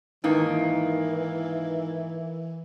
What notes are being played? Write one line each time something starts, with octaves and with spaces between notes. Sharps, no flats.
G#2 D#3 E3 A#3 D#4 E4 B4